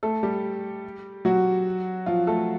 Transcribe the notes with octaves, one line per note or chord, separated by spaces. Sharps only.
A3 A4
G3 G4
F#3 F#4
F3 F4
A3 A4